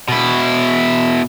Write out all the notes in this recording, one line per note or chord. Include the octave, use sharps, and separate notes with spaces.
B2 E4